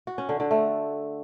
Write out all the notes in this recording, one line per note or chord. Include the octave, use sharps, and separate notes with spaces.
F#4
C#4
D3
D3
A3